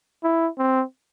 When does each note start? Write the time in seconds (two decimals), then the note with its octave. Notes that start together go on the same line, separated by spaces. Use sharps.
0.24 E4
0.58 C4